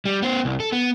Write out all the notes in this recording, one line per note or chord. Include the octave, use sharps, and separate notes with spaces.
G3
B3 C5
C2
A4
B3